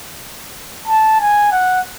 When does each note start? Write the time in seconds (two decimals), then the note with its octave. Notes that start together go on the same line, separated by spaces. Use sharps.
0.88 A5
1.20 G#5
1.52 F#5